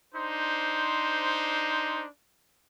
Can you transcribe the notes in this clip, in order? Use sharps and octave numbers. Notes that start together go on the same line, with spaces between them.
D4 D#4 C5